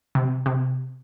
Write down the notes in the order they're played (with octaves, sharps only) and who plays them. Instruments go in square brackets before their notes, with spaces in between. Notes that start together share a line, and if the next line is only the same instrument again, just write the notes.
[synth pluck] C3
C3